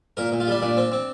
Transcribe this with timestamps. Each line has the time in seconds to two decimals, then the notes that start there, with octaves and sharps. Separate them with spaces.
0.17 A#2 A#4
0.32 A#2
0.40 F4
0.48 G3 D4
0.62 A#2 D4
0.77 C4
0.92 C4